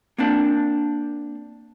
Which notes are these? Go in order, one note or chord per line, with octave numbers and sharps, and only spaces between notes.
A#3 C4 D4